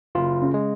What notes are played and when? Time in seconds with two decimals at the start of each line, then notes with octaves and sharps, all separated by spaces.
0.15 F#1 F4
0.42 C#3
0.54 G#3